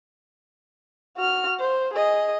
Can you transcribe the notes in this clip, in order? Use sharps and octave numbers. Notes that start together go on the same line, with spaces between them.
F#4 F6
C5
G#4 D#5